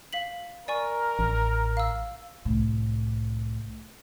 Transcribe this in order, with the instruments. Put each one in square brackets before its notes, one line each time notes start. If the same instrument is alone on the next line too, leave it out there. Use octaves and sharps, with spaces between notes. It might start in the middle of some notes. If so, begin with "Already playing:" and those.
[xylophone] F5 B6 F#7
[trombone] A#4 [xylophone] D5 G#5 C#6
[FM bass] A1
[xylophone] F5 E6
[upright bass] C2 A2